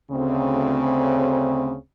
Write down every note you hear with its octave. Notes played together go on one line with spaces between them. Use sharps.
D2 C#3 C4